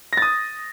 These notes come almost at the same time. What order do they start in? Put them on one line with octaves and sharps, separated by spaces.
A#6 A6 D#6